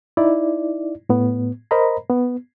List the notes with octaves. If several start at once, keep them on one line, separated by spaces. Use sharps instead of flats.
D#4 E4 D5
A2 B3
A#4 C5 D#5 A#5 B5
B3